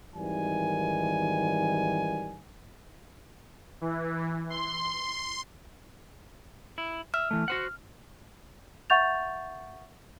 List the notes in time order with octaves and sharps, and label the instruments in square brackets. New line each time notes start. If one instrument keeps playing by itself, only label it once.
[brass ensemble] G#1 D#3 E3 G3 G#5
[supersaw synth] E3
C6
[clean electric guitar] E4
[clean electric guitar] E5 [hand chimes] F6
[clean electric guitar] E3 A3
F#4 C5 F#5
[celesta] E5 F#5 C#6 G6 A6 F7